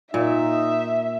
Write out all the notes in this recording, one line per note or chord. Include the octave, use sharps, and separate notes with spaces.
A#2 D#4 E5